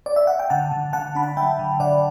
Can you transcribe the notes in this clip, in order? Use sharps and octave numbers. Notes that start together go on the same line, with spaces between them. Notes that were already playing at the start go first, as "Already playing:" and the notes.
D5
E5
F#5
G5
D3 F#5 A5
D3
D3 F#5 A5
D4 B5
F#5 A5
F#3 E5 G5
D3
D3 D5 F#5